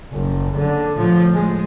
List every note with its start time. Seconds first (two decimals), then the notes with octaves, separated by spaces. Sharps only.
0.12 F#1
0.56 D3
0.96 A2 F3
1.34 G#3